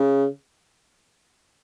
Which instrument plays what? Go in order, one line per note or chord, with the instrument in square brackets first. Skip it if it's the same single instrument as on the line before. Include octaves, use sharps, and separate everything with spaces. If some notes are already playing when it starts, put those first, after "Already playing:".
Already playing: [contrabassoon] C#3